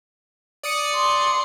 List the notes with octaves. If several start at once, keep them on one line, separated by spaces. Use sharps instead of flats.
D5 D#6 C#7
C6